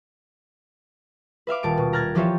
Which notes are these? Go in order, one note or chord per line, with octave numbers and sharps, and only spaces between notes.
B4 E5 F5 D6
D#1 A5 D7
B2
A#5 F6 F#6 G#6 A6
E3 F3 F4 G4 C#5 E5